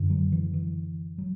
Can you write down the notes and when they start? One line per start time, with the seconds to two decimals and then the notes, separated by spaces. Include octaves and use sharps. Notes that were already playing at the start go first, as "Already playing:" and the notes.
Already playing: F#2 D3
0.10 F#3
0.32 E3
0.54 E3
1.18 F#3